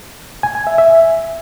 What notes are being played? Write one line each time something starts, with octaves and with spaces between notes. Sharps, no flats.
G#5
G#5
E5
E5